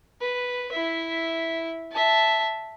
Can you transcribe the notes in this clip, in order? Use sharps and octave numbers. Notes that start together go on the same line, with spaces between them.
B4
E4 E5
E5 A5